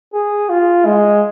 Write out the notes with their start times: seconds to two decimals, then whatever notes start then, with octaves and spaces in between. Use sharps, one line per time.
0.14 G#4
0.49 F4
0.85 G#3